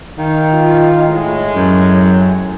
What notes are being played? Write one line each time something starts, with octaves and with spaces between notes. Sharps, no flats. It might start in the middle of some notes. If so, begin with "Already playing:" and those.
D#3 F5
F4
A2 G#3
F#2